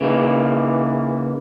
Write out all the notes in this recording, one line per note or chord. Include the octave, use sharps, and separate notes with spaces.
C#3 E3 A#3 D#4